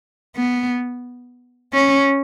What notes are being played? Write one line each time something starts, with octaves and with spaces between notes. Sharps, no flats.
B3
C#4